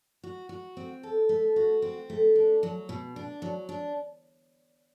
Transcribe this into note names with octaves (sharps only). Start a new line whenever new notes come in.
F#4
F#4
C4
A4
A3
F#4
C4
A3
D4
F#3
B2
D4
F#3
D4